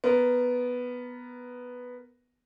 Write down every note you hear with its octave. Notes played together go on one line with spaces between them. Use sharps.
B3 A#4